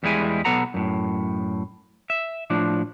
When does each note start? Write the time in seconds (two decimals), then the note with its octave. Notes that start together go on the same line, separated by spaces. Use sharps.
0.03 E2 G3 G#3 E4 G#5
0.45 B1 B3 A4 F#5 A#5
0.74 F#2 A2
2.10 E5
2.50 A2 F3 D4